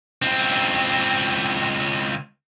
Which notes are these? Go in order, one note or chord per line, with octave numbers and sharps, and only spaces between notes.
C#2 C4